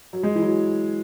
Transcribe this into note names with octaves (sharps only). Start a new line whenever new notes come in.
F#3
G#3
E3
F#3